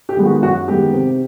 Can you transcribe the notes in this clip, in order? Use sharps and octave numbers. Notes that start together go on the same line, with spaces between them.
G4
D#3 G#3 B3
F#4
F#2 F#4
D#3 G#3 B3 G4
C3